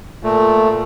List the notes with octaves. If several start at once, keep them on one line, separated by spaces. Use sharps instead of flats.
A#2 A3